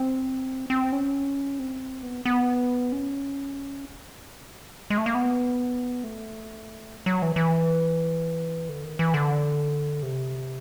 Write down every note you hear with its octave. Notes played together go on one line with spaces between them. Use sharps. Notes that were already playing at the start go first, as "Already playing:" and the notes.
Already playing: C4
C4
C#4
C4
B3
B3
C#4
G#3
A3
A#3
B3
A3
F#3
E3
E3
D3
D#3
E3
D3
C3